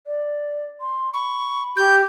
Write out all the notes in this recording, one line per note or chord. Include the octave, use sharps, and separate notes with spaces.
D5
C6
B5 C#6
G4 G6